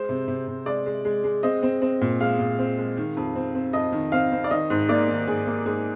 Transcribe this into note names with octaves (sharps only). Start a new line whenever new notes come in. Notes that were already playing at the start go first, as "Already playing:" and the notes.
Already playing: G#3 C5
C3
C3
C3
G#3 D5
G#3
G#3
G#3
C4 D#5
C4
C4
A#2
G#3 F5
A#2
C4
G#3
D#3
F2
C4
C4
F2 D#5
D#3
C4 F5
C4
D5
D#3 D#5
G#2
A#3 D5
D#3
G#2 G#4
A#3
G#2 G#4